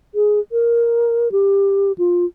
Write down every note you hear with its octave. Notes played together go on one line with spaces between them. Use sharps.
G#4
A#4
G4
F4